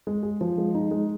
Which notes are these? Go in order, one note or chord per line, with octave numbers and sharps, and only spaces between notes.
G#3
G#4
F3
G#3
D#4
G#3